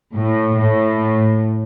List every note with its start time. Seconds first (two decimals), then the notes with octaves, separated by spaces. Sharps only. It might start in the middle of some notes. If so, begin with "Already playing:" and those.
0.14 A2
0.57 A2